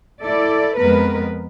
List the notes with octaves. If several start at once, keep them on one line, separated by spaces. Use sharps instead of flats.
E4 A4 D5
F2 G#3 B3 A#4 B4